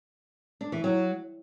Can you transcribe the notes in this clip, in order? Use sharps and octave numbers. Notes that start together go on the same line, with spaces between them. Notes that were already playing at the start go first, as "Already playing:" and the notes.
D4
E3
F#3